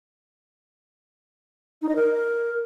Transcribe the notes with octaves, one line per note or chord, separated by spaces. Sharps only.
D#4
D#5
A#4